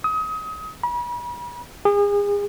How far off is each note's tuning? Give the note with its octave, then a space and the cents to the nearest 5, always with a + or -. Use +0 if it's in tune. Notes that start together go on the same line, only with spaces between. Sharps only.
D#6 +30
B5 -40
G#4 -35